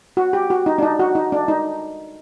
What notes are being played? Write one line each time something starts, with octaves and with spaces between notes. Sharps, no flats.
F#4
G4
F#4
D#4
D4
D#4
F#4
D#4
D4
D#4